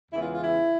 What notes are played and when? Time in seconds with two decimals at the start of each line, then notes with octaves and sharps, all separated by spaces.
0.11 E2 C#3 E3 G#3 B3 E4
0.22 F4
0.33 F4
0.43 E4